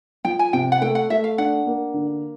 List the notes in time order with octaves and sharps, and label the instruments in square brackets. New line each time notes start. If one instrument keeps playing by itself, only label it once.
[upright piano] F3 [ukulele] G5
[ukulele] G#5
[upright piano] C3 [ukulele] G5
[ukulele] F#5
[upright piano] A3 [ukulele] G5
[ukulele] F#5
[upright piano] A3 [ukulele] E5
[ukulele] F5
[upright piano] D4 [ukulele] F#5
[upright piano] A#3
D3